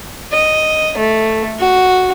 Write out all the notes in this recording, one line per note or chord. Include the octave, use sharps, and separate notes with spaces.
D#5
A3
F#4